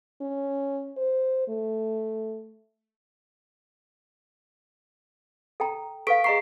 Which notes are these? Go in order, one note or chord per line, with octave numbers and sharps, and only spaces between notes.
C#4
C5
A3
A4 G5 A#5
A4 B4 F5 C#6 B6 D7
G#4 D#5 A#5 C#6 C7